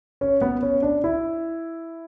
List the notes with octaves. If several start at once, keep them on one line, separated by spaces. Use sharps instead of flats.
C#4
B3
C#4
D4
E4